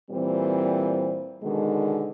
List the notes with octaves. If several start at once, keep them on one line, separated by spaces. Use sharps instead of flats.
A#2 E3 G3 C4
B2 D3 D#3 G#3